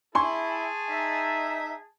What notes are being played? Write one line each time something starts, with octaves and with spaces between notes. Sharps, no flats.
E4 G#4 G#5 A5 C6 C#6
D#4 E5